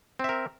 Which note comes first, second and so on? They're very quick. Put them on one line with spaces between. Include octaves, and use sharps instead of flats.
C4 E5 A#4